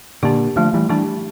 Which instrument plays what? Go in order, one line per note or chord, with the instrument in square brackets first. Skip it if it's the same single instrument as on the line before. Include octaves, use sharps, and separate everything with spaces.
[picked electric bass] A#2 D3 [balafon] D4 G4
[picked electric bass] D3 F3 [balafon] A3
[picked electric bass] E3 G3
[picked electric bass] E3 G3 [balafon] D4 G4